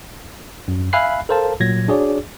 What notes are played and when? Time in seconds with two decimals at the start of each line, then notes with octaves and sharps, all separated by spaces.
0.68 F#2
0.93 E5 F5 G#5 B5 F#6 C7
1.29 A4 A#4 C5 F5 A5
1.60 A#2 F#3 G#6 A#6
1.88 D4 F#4 G#4 C#5 D5